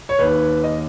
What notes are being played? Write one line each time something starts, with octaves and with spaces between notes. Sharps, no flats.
C#5
D#2 D#3 B4
D#5